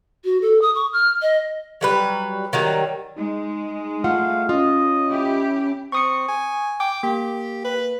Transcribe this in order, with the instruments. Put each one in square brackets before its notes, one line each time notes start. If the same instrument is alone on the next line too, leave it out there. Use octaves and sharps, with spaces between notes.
[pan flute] F#4
A4
D#6
C#6
F6
D#5
[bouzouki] F#3 G3 B4
D#3 F#3 G3
[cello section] G#3 [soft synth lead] D#4
[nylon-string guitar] A3 F4 F#5 [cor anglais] F5
[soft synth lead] C#4 [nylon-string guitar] F4 [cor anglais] D#5
[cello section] E4 G4
[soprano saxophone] C4 [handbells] C#6 D#6 C#7
[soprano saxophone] G#5
[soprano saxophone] G5 [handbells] D6
[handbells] A#3 [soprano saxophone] G4
[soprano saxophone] B4